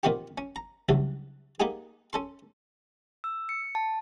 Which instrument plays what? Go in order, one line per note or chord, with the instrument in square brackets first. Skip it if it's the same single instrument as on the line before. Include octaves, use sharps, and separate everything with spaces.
[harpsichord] A#2 D#3 B3 C4 F#4 G4
C#4
A#5
C#2 G2 C#3 E3 F#3
A#3 B3 D#4 G4 G#4
C#4 A4 C6
[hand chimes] E6
C#7
A5